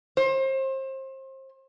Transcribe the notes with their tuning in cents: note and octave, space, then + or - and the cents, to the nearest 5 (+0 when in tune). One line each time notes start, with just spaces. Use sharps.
C5 +30